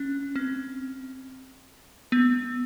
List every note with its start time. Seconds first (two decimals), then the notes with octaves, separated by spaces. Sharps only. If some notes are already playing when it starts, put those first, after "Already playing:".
Already playing: C#4
0.36 C4
2.12 B3